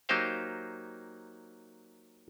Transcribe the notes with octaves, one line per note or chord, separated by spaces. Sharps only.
F#3 A#3 D#4 G4 C5 F5